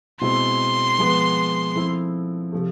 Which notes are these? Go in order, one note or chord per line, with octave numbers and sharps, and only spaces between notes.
B2 G#3 C4 E4 C6
F3 G#3 B3
F3 A3 C4 E4
C3 F3 A3